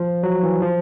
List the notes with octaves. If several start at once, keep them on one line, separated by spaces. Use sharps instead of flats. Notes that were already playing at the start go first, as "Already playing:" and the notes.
Already playing: F3
F#3
E3
F3